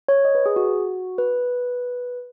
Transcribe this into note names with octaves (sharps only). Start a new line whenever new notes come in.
C#5
D#5
B4
G#4
F#4
B4